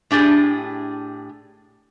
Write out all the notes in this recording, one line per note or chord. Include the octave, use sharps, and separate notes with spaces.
A2 D4 G4 G#4